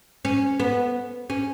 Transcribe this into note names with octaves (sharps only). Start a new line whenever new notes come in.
C#4
B3
C#4